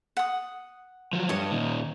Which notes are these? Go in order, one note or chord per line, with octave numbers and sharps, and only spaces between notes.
F#5 D#6
F3 F#3
G2 C#5 D#5
A#2 D#3